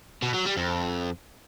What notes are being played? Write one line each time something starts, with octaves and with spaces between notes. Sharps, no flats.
B2
F#3
G3
F2